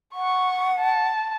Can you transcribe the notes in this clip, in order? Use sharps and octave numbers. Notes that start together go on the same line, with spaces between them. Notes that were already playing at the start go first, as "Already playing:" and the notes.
F#5 C#6
A5